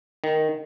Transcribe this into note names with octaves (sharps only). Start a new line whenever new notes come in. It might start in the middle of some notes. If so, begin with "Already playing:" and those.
D#3